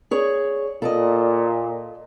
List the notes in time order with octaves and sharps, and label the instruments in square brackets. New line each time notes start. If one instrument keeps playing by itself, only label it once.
[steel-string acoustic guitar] G#4 C#5 D5
[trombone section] A#2 [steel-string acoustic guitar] A4 D5 D#5